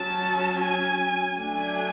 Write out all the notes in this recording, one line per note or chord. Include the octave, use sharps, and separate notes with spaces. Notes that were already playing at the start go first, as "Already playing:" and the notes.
Already playing: F#3 C#4 A5
G#5
F#3 A3 D4 G#5